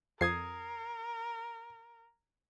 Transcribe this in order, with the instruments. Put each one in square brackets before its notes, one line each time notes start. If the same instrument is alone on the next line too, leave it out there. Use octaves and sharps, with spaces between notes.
[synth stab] F2 [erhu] A#4 [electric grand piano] D#6 G#6 C7